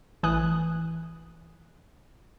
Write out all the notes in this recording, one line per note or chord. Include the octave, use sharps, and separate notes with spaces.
A1 E3 G#5 D#6 F#6